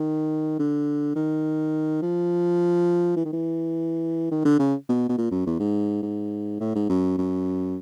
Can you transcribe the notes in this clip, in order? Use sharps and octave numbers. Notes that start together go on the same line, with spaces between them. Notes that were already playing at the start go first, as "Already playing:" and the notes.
Already playing: D#3
D3
D#3
F3
E3
D#3
E3
D#3
D3
C#3
B2
B2
A#2
F#2
E2
G#2
G#2
A2
G#2
F#2
F#2